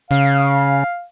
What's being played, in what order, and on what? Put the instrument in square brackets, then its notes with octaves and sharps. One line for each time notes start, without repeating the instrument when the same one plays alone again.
[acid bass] C#3 [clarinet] F5